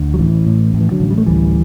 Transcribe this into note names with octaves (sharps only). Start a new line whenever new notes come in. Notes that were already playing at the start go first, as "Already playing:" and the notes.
Already playing: D2 D3
F#3
A1 E3
A2
A2
E3
D3 F#3
A1
G3
A3
D2 E3 G3